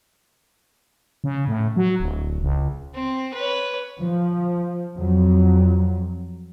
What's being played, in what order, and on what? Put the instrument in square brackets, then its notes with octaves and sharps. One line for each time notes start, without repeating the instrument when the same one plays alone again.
[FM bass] C#3
A2
F#3
D1
C#2
[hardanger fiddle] C4
B4 C#5
[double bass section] F3
F2 F#3